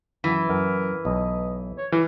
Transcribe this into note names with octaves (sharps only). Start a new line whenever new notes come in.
F#2 E3
F#2 A#4
B1 D#5
C#5
E3 F6